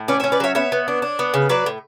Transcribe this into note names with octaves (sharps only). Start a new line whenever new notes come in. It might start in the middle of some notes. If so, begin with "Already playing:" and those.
Already playing: A2
C#4 B4 D5
C#4 C#5 E5
B4 D5
F#3 C#5 E5
B3 C#5 E5
B3
D4
D4
B3
C#3
F#3 B4 D5
A2